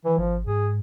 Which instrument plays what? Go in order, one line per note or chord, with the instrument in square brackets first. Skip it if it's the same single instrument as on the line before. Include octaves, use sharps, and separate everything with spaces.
[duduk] E3
[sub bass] G#1 [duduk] F3
[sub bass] G#2 [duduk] G#4